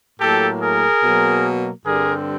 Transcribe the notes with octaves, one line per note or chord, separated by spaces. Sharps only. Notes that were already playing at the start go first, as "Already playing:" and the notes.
A2 F#3 A#3 G4 A4
G#4 A#4
B2 F#3 A#3
G2 D3 G3 C4 G#4 A#4